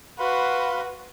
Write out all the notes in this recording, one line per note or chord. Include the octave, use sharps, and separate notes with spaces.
F#4 B4 F5 B5 C6